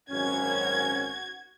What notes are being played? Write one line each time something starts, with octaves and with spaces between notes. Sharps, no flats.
G#1 F#2 C#4 F#4 G#6